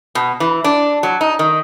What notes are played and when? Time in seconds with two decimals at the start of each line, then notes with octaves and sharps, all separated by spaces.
0.15 B2
0.40 E3
0.64 D4
1.03 F#3
1.21 D#4
1.39 D#3